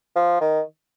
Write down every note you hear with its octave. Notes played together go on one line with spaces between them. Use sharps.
F3
D#3